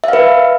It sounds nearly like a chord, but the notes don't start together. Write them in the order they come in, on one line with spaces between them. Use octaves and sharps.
E5 F5 B4